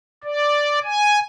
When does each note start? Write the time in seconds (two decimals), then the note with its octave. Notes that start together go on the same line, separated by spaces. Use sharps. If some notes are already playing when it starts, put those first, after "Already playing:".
0.24 D5
0.84 G#5